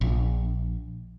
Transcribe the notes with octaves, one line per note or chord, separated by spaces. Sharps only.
A#1